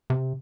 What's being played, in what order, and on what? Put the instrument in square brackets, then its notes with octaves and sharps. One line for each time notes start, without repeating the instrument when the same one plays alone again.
[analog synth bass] C3